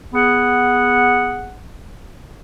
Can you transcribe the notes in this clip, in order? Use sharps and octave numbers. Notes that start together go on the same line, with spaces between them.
B3 G#4 F#5